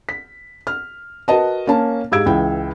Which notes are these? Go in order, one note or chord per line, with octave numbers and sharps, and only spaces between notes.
B6
F6
F#4 A#4 B4 D#5 A5
A#3 C#4 A5
G#2 G4 F5 E6 G#6 D7
C#2 E3 G5